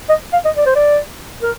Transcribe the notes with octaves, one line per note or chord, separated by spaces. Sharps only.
D#5
F5
D#5
D5
C5
D5
A#4